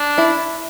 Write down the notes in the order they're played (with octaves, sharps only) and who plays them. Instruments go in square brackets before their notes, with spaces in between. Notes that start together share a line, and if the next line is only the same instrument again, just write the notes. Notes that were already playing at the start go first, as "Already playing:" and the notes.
Already playing: [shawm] D4
[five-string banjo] E4